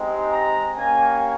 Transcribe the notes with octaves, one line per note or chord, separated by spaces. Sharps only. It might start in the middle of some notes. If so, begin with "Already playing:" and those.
Already playing: G#3 C4 D#4 G4
A#5
A#3 C#4 G4 G#5